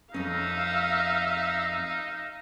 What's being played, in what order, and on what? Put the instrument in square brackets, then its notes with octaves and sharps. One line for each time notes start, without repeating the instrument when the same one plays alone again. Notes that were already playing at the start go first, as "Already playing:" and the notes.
[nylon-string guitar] F2 C#4 [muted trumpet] D#4 [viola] E5 F5